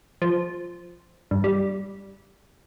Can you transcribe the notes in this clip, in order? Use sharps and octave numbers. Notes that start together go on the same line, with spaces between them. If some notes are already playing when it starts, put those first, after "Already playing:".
F3
G2
G3